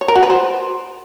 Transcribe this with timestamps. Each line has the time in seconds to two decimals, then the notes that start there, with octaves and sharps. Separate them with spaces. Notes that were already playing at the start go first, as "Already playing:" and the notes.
0.01 C#5
0.08 A#4
0.15 F#4
0.23 B4
0.30 C5